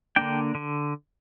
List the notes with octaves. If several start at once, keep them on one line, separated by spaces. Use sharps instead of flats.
D3 A#3 D4 G5
D3